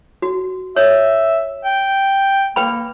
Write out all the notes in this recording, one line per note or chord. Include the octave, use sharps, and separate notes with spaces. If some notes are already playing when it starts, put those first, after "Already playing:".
F#4
C#5 E5
G5
A#3 B4 G5 B5